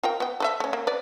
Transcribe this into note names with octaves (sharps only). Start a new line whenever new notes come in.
F4 A#4 G5
B3 G5
A4 B4 E5
A3 C#4
A#3
B4 D5